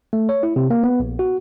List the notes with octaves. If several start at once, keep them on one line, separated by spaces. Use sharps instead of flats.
A3
C#5
E4
C3
A#3
B3
A#1
F#4